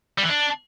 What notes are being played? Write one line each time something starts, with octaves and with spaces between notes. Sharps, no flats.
G3
E3
D4